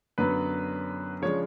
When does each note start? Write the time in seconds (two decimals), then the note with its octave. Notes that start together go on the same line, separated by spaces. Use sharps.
0.18 F#2 D3 F#3 B3 B4
1.22 C#3 F3 G#3 D4 C#5